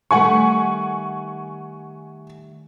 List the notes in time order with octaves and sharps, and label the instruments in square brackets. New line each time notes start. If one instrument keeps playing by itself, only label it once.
[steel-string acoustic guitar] D#3 G3 A3 [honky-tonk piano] F#5 G#5 C#6